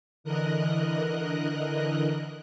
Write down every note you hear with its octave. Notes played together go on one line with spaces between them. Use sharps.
D3 E3 A#4 D#5 F#6